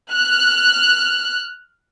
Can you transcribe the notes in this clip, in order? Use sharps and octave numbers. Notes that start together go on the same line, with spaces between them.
F6 F#6